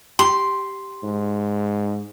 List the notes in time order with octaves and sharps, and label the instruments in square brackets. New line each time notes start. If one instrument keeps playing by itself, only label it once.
[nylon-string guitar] G4 [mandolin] C6
[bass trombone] G#2